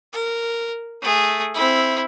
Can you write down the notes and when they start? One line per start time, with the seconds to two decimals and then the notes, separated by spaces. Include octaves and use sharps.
0.13 A#4
1.02 A3 G#4
1.54 C4 E4